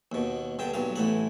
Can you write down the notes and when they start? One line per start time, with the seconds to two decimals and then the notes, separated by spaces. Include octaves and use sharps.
0.12 D#2 B2
0.59 G2 D3 G5
0.74 B1 G2 F5
0.96 A1 A2 F#5